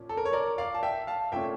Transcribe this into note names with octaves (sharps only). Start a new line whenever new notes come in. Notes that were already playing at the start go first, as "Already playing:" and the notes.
Already playing: A#2 F3 C#4
A4
A#4
C#5
A#4 D5
D5 F5
A5
E5 G5
F5 A5
A#2 A3 C#4 E5 G5